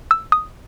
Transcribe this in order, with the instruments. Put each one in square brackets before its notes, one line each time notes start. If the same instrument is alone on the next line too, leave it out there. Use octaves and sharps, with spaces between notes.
[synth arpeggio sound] E6
D#6